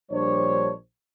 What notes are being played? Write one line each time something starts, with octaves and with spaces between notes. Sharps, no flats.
A#1 G3 D4 C5 C#5